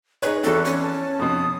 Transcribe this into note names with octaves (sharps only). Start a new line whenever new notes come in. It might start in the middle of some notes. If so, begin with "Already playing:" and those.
D#4 G#4 B4 C#5
E2 C4 F#4 A4
C#4
A5
F2 B2 D#6